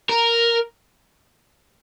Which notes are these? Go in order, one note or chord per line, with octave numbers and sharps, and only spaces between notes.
A#4